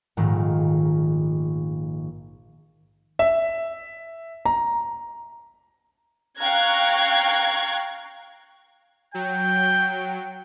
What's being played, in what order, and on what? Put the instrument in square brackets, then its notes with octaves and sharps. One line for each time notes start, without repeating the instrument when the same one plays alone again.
[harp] A#1 G#2 D#3 A3
[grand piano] E5
A#5
[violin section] F5 G5 A#5 C#6 F#6 G#6
[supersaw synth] F#3 [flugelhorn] G5 [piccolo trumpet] G6